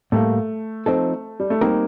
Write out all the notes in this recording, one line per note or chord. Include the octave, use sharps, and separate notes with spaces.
A2 G3 A3 A#3
F3 C4 D#4 A4
G3
A3
G3 A#3 C4 D#4 G4 A#4